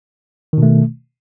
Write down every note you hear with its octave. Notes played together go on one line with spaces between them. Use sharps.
B2 D#3 A3